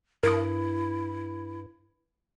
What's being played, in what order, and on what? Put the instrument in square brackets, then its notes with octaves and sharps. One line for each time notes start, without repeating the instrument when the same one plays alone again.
[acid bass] G2 [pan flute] E4 [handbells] A#4 D#6